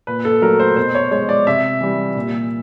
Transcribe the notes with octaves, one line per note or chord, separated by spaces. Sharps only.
A#2 B4
A4
F#3 A3 A#4
C5
B2 C5
C#5
G#3 C#5
D5
C3 E5
E3 G3
A#2